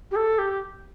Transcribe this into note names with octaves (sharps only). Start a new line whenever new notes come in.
G4
A4
G4